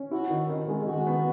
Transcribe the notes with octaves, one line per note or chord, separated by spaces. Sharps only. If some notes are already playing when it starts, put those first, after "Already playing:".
Already playing: C#4
E4 F#4
D#3
D#3
G#3
D#3 F#4
B3